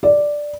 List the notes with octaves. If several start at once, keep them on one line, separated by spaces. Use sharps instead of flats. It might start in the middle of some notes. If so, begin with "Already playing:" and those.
D5